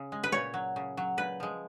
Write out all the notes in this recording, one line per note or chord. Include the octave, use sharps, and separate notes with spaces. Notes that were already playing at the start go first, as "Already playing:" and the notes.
Already playing: C#3
G#3
B4
A#2 C#5
F#3
C#3
F#3
A#2 B4
F3 G#3